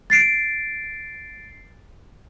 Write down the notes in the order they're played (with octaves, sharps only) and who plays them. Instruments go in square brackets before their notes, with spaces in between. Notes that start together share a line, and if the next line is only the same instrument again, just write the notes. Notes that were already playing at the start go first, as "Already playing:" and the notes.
[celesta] A6 C7 D7